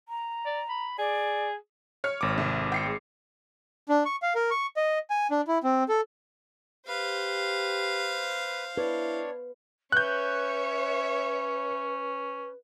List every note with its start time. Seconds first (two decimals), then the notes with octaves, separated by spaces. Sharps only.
0.09 A#5
0.46 D5
0.69 B5
0.98 G#4 D5
2.04 C#5 F6 C#7
2.21 G#1 D6
2.38 C2
2.72 G5 C7 C#7
2.86 G#3
3.89 D4
4.06 C#6
4.22 F5
4.35 A#4
4.51 C#6
4.76 D#5
5.10 G#5
5.31 D4
5.48 E4
5.63 C4
5.89 A4
6.88 G4 B4 C5 F5
8.78 D4 E4 B4 C#5
9.92 C#4 B4 C#5 E5 F#6 G6